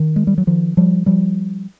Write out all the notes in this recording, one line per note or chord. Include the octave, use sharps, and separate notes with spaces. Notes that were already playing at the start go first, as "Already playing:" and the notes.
Already playing: D#3
G#3
G3
F#3
D#3 F3
F3 G3
F3 G3